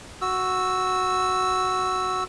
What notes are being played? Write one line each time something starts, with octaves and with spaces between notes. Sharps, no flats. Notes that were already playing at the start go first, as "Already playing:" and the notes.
F#4 E6